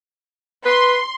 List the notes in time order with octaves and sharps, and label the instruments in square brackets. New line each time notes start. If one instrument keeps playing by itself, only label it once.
[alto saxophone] B4 [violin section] C6